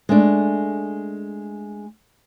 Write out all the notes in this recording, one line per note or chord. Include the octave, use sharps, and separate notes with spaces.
G#3 A3 D4